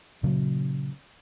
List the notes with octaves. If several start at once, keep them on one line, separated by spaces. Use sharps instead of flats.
A#2 C#3 F#3